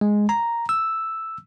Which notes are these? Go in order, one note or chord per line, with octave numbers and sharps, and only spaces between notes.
G#3
A#5
E6